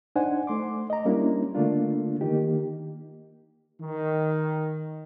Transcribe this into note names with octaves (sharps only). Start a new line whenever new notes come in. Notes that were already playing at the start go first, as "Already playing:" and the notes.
D4 D#4 C5 F#5 G#5
A3 C6 D6
D#5 A#5
G3 A#3 C#4 D4 E4
D3 A3 A#3 D4 F4
D#3 A#3 D#4 G4
D#3